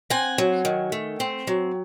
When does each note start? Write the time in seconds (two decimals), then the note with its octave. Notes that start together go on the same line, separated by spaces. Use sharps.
0.10 C4 F#5 G#5
0.38 F#3
0.65 D#3
0.92 A3
1.20 C4
1.47 F#3